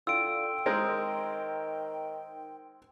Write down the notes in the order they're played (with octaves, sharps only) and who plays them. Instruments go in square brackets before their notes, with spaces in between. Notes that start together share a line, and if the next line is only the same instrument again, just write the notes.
[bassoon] D3 [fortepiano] F4 [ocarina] G5 [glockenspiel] E6 D7
[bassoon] D#3 [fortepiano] G#3 C4 A#4